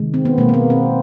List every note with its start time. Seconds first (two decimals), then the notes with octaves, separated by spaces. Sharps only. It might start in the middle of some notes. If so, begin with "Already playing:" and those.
Already playing: C3 D#3 G#3
0.14 C4
0.25 B3
0.38 B2 A#3
0.40 G#3
0.49 A#3
0.54 B3
0.70 C4